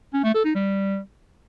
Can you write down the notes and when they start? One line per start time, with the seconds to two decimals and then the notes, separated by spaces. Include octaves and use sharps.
0.14 C#4
0.24 A3
0.34 A4
0.45 D#4
0.55 G3